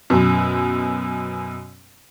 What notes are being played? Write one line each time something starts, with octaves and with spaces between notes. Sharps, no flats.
F#2 B2